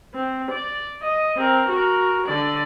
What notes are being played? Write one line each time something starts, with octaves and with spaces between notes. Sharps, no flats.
C4
D5
D#5
C4 A#4
F#4 A#4
D3 D5